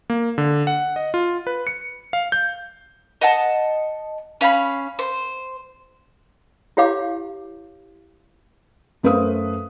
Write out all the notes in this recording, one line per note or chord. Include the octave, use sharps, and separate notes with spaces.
A#3
D3
F#5
D#5
F4
B4
C#7
F5
G6
D#5 F#5 A5
C#4 F5 G5 B5
C5
E4 G4 C#5 F5 D6
F#2 A3 B4 C5 F5 D#6